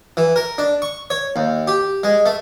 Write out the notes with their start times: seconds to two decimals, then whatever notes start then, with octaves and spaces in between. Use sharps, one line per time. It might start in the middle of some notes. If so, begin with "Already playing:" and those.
0.17 E3
0.36 A#4
0.58 D4
0.82 C#6
1.10 C#5
1.36 D#2
1.67 G4
2.03 G#3
2.26 A3